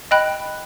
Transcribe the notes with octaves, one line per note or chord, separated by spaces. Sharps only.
D#5 G5 B5 F#6